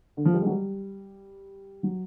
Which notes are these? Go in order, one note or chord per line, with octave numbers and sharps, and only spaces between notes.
D3
F3
G3
G#3
F#3
G3
F#3